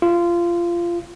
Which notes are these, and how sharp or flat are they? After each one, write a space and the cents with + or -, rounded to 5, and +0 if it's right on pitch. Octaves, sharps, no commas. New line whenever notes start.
F4 -20